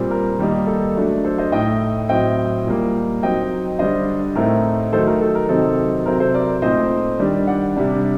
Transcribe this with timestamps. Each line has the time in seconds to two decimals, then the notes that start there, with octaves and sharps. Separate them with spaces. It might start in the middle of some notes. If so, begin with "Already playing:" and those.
Already playing: A#2 G3 C4
0.11 A#4
0.39 D#3 G3 A#3 D#4
0.67 A4
0.96 F#3 A3 D4
1.24 A4 C5
1.38 C5 D#5
1.52 A2 A3 D#4 D#5 G5
2.09 A2 F#3 C4 D#5 G5
2.66 A#2 G3 A#3
3.22 F#3 C4 D#4 D#5 G5
3.79 D3 G3 D4 C5 D#5
4.35 A2 A3 C4 D#4 A#4
4.92 D#3 F#3 A3 D#4 A4 C5
5.07 A#4
5.21 A4
5.35 A#4
5.49 C3 D#3 F#3 C4 D#4 A4
6.06 C3 F#3 C4 A#4
6.20 A4 C5
6.34 A#4 D5
6.62 A#2 A3 C4 D#4 C5 D#5
7.19 D#3 G3 D4
7.47 D5 F#5
7.76 C3 G3 D4